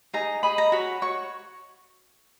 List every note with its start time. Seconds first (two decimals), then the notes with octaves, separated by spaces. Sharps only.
0.14 D#4 G#4 D#5 A#5
0.43 D#4 G#4 D#5 B5
0.58 A#5
0.72 F#4 C#5 B5
1.02 F#4 C#5 C#6